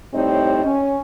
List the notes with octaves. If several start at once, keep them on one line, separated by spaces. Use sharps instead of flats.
A2 G3 C4 D#4 C#5 D5
C#4